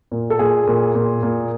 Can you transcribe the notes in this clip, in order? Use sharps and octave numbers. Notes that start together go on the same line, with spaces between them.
A#2
A4
A#2 G#4
A#2
A#2
A#2